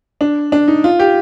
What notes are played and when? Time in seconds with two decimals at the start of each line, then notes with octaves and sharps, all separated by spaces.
0.21 D4
0.52 D4
0.68 D#4
0.84 F4
0.99 G4